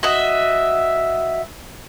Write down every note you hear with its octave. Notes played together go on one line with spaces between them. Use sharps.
F#4 D#5 E5